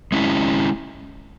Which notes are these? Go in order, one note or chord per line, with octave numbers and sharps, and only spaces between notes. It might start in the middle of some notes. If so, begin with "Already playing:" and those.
G#3 C#4 E4